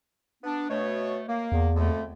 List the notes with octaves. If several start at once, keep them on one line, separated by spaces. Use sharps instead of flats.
B3 D4
B2 A3 C#5
A#3
E2
F2 D3 A3